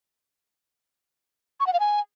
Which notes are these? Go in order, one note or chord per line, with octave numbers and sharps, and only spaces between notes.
C#6
F#5
F5
G#5